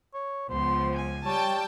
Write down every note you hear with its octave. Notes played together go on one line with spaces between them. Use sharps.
C#5
C#2 F3 B3 C5 C6
G#5
G3 C#5 G5 A5